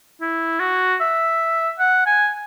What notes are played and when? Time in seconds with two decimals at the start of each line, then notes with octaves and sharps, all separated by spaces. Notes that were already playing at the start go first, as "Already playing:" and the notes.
0.21 E4
0.60 F#4
1.01 E5
1.79 F#5
2.06 G#5